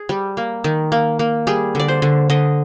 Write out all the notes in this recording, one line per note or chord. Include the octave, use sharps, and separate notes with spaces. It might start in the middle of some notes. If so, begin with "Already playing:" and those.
Already playing: G#4
G3
A#3
D#3
A#3
A#3
G3 G#4
D3 D5
C5
D3
D3 D#5